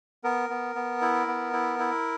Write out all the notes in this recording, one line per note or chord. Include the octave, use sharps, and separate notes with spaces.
B3 A#4
B3
B3
E4
B3
E4
E4